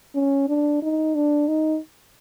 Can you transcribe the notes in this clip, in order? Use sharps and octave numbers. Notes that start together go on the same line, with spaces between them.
C#4
D4
D#4
D4
D#4